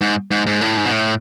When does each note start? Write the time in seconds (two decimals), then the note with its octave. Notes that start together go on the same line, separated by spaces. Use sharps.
0.01 G#2
0.31 G#2
0.46 G#2
0.61 A2
0.77 G#2
0.85 B2
0.91 A2